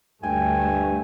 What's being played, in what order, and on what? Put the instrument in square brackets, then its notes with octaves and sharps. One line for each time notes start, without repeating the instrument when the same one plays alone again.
[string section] D2 A3 [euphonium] G2 [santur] G5 [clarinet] G#5